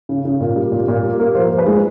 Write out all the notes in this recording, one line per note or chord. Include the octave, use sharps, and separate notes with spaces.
C#3
C#3
A#2
G3
A#2
A#2
G3
A#3
F3 C5
F3
B4
G#3